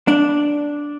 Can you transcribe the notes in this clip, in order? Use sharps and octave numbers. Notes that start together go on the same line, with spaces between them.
D4